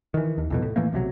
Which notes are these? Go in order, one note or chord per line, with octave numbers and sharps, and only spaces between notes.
D#3 E3
D#2
C2 F2 B2
A2
A2 E3 A3 A#3
B1 C3 E3 F#3